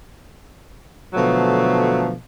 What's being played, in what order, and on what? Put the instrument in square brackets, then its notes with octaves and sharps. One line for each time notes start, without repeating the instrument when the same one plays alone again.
[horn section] B2 D3 F3 F#3 A3